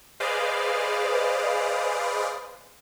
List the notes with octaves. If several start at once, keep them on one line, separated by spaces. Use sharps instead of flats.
G#4 B4 C5 D5 D#5 F5